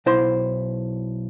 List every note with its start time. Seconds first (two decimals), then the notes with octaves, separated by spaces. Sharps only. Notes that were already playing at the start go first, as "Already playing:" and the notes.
0.06 B1 E4 C5 C6